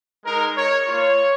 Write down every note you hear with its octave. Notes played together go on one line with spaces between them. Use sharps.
G#3 D#4 A#4
C#5
A#3 F4 C#5